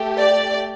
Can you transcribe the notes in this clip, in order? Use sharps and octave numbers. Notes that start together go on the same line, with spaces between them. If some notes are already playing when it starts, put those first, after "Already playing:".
Already playing: A3 G4
D5